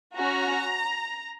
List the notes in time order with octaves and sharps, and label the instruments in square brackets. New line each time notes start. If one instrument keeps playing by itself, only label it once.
[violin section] C#4 F#4 A#5